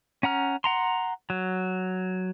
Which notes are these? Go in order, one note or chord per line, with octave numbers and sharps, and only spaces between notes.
C#4 F#5 A#5 F6
F#5 A#5 C6
F#3